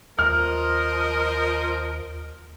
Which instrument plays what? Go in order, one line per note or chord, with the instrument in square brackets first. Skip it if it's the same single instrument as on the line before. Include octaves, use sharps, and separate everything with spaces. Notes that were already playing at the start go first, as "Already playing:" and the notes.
[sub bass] D#2 [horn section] F3 A#4 D#5 [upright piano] F6